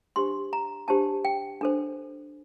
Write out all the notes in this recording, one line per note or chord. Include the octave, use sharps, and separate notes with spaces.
D4 G4 C5 C6
A#5
D4 G4 C5 A5
G5
D4 A4 C5